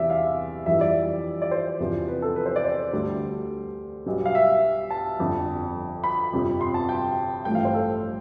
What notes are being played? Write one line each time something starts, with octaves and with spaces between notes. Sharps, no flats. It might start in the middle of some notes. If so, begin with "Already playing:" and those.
Already playing: E1 E2 C3 G3 D5 E5
F5
F2 E3 G3 E5
D5
D5
C5
E2 C3 F3
B4
A4
B4
C5
D5
C5
D2 D3 G3
B1 B2 G3
F5
E5
A5
G1 F2 D3
B5
G1 F2 C3 F3
C6
A5
G5
A1 G2 F3 A3 G5
F5
C5
A4